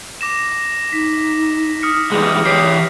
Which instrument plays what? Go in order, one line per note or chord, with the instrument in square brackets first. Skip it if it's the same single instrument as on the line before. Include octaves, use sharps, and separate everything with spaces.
[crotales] D6 A#6 E7
[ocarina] D#4 [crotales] B6
[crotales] D#6 F6 C#7
[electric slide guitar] E3 G3 G#3 [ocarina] G#4
[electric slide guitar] E3 G4 [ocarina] C#5 [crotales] D#6 B6 C7